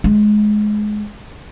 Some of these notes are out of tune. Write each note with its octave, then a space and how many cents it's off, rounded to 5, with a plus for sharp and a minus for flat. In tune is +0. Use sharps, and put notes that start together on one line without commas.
G#3 +20